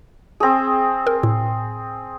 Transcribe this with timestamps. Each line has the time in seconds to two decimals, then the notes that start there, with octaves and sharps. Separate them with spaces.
0.40 C4 G#4
1.07 A#4
1.23 A2